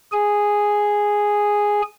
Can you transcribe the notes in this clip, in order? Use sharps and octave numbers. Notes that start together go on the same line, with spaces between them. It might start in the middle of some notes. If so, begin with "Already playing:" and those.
G#4 G#5